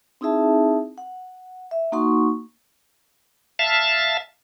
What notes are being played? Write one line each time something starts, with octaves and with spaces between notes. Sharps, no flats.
C4 D#4 E4 G#4 E5 A5
F#5
E5
A#3 D#4 F#4 F#5 C6 C#6
E5 F5 A5